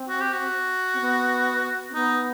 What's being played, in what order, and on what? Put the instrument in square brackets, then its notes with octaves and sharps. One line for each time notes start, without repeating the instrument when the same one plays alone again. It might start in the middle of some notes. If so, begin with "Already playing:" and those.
Already playing: [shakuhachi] C4
[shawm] F#4
G4
F#4
[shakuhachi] C4
B3
C4
[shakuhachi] B3 [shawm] D#4